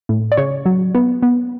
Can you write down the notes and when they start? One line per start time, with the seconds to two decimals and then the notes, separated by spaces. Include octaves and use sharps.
0.09 A2
0.32 D5
0.37 C#3 C#5
0.66 F#3
0.95 B3
1.22 B3